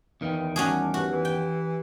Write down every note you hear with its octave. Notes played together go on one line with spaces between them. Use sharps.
E2 D#3 B4 F5 G5
G3 C#4 F#4 G#4 A5 D6
F#4 G4 B4
E3
G5